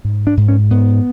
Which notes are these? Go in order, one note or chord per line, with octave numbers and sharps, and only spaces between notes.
G#2
D4
G#2
C#4
G#2 B3